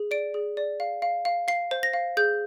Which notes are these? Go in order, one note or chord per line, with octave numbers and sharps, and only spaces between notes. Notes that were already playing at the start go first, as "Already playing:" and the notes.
Already playing: G#4
D5 D7
G#4
D5
F5
F5
F5
F5 C7
C5
A#6
F5
G#4 G6